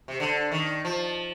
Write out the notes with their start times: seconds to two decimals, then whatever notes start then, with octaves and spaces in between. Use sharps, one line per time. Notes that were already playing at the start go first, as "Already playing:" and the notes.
0.08 C3
0.20 D3
0.51 D#3
0.85 F3